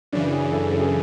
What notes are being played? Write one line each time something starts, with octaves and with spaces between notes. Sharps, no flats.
F#2 C#3 E3 D4
G#4
A4
A4
G#4
A4